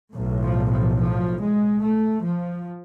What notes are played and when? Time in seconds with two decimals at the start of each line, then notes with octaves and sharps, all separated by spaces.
0.14 B1 A2
0.43 F3
0.71 F3
0.98 F3
1.41 G#3
1.83 A3
2.25 F3